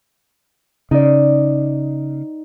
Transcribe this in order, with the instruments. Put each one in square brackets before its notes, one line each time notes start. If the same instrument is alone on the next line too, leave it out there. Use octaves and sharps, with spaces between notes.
[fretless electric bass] C#3 [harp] D#4 D5